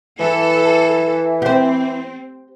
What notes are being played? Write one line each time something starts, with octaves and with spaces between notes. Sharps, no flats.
E3 A4
C4 G4 C5